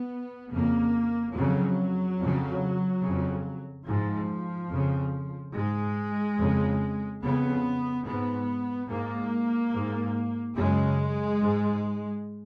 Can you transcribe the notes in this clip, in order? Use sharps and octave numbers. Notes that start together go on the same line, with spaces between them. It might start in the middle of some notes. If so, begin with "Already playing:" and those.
Already playing: B3
F2 C#3 A#3
F2 C#3 F#3
F2
C#3
F2 C#3
G#2 F3
F2 C#3
G#2 G#3
F2 C#3
F2 C#3 B3
G#2 B3
G#2 A#3
G#2
F#2 C#3 G#3
G#2